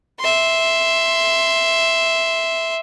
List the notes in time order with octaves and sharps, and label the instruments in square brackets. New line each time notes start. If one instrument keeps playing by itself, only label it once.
[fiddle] E5 C6